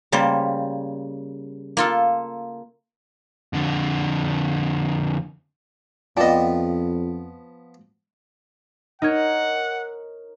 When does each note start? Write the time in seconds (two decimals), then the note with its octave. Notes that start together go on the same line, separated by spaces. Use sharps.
0.12 C#3 G3 A#3 C5
1.77 A#3 F4 A4
3.53 F2 D3
6.17 F2 F3 B3 F4 D5 D#5 G5 A5
9.02 D#4 A#4 C#5 F#5